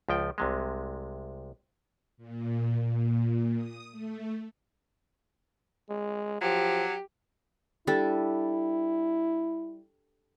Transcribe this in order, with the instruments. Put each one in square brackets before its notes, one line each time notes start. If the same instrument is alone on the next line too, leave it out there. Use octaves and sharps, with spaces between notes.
[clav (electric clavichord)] C#2 F3 G5
C2 C3 G#3
[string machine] A#2
A#2
D#6
A3
[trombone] G#3
[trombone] F3 [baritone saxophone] F#3 [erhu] G4
[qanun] G3 D4 A4 [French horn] E4